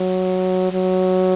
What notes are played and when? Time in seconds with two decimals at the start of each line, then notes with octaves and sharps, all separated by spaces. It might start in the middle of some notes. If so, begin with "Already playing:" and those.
Already playing: F#3
0.72 F#3